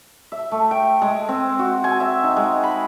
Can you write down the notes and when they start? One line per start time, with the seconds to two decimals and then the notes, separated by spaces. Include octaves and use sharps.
0.32 E5
0.52 A3
0.71 G5
1.02 G#3
1.29 C4
1.59 F#4
1.84 G#5
2.00 E5
2.24 D#4
2.36 G#3
2.64 B5